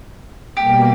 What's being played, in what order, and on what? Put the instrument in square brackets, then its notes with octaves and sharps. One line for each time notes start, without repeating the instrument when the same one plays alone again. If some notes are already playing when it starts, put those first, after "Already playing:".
[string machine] B2 G3 A#3 [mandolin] G4